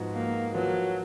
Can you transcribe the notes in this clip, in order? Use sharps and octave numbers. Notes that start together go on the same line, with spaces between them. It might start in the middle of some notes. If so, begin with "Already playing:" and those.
Already playing: G#2 F3 B3 F#4
A#3
F3 F#3 A#3 F4 B4